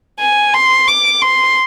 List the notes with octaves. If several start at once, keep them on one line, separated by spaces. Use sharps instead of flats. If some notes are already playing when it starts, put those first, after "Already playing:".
G#5
C6
D6
C6